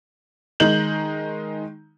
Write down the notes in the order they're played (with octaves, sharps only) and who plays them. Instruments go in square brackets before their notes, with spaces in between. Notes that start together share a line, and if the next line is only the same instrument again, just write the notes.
[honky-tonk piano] D#3 G#3 D#4 G6 F#7